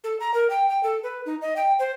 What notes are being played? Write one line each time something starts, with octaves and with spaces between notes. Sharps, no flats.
A4
A#5
A#4
G5
G5
A4
B4
D#4
D#5
G5
C5